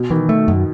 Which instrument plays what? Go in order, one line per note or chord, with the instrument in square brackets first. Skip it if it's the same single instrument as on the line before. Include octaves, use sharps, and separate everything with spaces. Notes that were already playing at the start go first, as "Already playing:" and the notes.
Already playing: [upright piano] B2
[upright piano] D#3 [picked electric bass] E3
[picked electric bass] A3
F#2